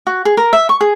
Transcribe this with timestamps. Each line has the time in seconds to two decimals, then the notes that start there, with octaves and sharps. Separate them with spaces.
0.07 F#4
0.25 G#4
0.37 A#4
0.53 E5
0.69 C#6
0.81 G#4